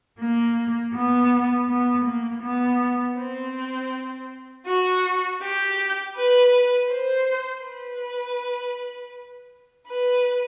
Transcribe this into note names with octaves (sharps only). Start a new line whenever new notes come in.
A#3
B3
B3
A#3
B3
C4
F#4
G4
B4
C5
B4
B4